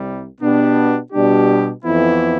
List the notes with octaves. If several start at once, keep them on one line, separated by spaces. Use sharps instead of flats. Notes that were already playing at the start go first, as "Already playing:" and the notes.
Already playing: C2 C3 G3
B2 B3 D4 G4
B2 G3 D4 G4
F2 E3 B3 E4